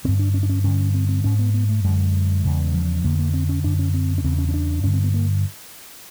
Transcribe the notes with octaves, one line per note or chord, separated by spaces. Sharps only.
G2 D3 C4
D4
C#4
D4
C#4
G2 D3 C#4
C4
C4
G#2 C#4
B3
B3
A3
F#2 D3 G#3
E2 C#3
F3
F2 D3 A#3
A#3
C4
C#4
F#2 D3 D4
C#4
C4
C#4
E2 C#3 C4
C#4
C#4
D4
G2 D3 C#4
C4
B3
A#3